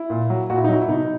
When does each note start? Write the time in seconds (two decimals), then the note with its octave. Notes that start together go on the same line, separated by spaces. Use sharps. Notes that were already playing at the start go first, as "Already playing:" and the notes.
Already playing: E4
0.10 A#2
0.30 F#3
0.50 A#2 F#4
0.57 E4
0.64 D#4
0.69 F#3 E4
0.82 E4
0.88 B2 D#4